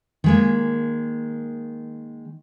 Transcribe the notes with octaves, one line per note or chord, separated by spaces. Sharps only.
D#3 G#3 A#3